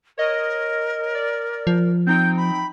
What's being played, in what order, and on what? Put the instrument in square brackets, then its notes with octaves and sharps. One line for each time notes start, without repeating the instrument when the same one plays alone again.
[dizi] A#4 [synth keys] C#5 D#5
[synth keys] D5
[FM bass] F3
[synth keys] C4 D#4 G5 [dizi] G6
[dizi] B5